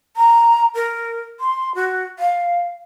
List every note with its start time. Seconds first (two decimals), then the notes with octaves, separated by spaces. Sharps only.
0.17 A#5
0.75 A#4
1.40 C6
1.75 F#4
2.19 F5